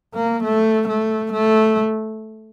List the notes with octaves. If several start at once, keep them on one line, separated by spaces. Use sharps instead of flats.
A#3
A3
A3
A3